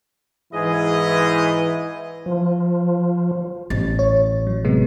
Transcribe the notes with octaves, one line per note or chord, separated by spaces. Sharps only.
G#2 E3 E4 G#4 D#5
F3
A1 A6
C#5
F#3
C3 G#3 B3